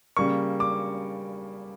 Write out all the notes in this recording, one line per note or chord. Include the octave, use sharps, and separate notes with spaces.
C#3 G3 A#3 C#6
D6